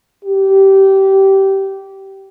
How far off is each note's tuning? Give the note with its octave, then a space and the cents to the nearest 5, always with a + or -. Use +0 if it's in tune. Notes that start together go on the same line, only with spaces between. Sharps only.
G4 -20